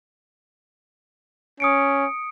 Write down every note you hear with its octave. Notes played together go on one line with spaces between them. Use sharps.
C#4 D#6 C#7 D7